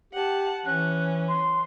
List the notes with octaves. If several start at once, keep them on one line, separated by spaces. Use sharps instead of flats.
G4 F#5 A5
E3 C#4 F#6
C6